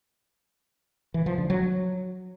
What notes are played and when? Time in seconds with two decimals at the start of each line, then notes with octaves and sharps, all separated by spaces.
1.14 E3
1.26 F3
1.38 D3
1.50 F#3